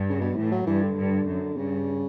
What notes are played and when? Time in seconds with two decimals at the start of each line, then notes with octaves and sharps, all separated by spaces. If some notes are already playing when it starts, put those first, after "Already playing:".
Already playing: G2
0.10 C#3
0.21 B2
0.37 A2 E3
0.52 F#3
0.67 G2 E3
0.83 D3
0.97 G2
1.27 F#2
1.57 G2 C#3